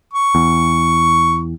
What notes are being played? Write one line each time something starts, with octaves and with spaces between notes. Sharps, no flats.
C#6
E2